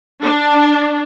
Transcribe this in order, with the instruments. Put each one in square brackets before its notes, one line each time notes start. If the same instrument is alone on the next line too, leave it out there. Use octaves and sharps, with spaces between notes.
[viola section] D4